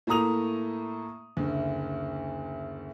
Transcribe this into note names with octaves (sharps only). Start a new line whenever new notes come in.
A2 A3 A#3 A#5 D#6 F7
F#1 D2